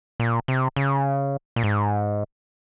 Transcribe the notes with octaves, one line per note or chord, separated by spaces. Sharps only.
A#2
C3
C#3
A#2
G#2